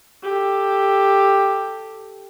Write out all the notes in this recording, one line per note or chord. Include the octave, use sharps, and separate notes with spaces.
G4 A4